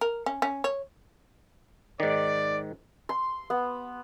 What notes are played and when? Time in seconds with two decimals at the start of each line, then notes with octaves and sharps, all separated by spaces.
0.01 A#4
0.26 C#4
0.42 C#4
0.64 C#5
2.00 G#2 D#3 D5
3.09 C6
3.50 B3